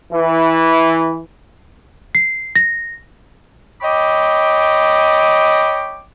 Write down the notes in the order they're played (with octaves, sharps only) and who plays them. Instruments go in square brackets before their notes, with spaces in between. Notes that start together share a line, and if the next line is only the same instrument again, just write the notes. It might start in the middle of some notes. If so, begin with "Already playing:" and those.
[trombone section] E3
[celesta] C7
A#6
[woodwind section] C#5 D#5 G5 B5 D6